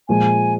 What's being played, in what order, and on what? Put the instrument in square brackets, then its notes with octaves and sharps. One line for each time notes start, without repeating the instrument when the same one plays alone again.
[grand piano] A#2 F3 G#3 [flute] G#5